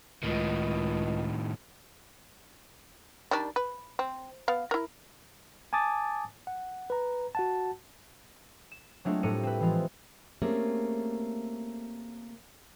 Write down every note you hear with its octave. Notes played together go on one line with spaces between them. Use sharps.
C#2 A2 D#3
D#3 G3 D4
B4
C4
B3 F5
E4 A#4
G#5 A5 D6 D#6 A6
F#5
B4 A#5
F#4 F#5 A5
E7
F#3 G#3 A3 C4 D4 F4
A2 G3 A4 A#4 C#7 D#7
C4 B4
E3 F3 G#3 F4
A3 A#3 C4 C#4 G4 G#4